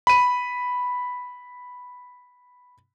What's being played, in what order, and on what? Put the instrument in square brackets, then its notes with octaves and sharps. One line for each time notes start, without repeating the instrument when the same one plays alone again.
[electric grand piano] B5 D#7